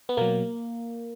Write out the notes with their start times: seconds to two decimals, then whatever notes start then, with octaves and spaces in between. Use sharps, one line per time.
0.09 B3
0.17 B2 F#3 A#3